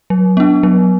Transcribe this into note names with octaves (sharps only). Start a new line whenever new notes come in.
F#3
B3 D4
F#3